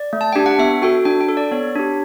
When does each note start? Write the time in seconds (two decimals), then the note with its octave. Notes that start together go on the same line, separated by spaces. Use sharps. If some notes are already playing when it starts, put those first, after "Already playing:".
Already playing: D5
0.13 A3
0.21 A5
0.33 D4 G4 G5
0.46 F#5
0.59 B3 E5
0.82 F#4 A4 G5
1.05 D4 G5
1.21 G5
1.29 A4
1.37 D5
1.51 B3 C#5
1.75 D4 G4